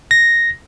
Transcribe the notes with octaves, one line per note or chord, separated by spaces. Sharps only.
A#6